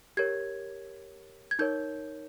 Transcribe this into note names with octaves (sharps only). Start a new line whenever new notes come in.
G4 A#4 C#5 G#6
G#6
D#4 A#4 C#5 G6